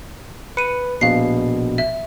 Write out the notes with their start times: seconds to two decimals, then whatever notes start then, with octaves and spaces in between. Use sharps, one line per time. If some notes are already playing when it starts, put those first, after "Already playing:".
0.57 B4 C#7 D#7
1.01 A#1 B2 F5 C7
1.78 E5